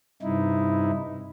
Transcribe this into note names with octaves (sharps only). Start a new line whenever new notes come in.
G2 C3 D#4 E4